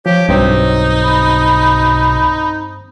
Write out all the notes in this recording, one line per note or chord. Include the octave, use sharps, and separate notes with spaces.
F3 G4 C#5
B1 G2 C4 D#4 C5
B5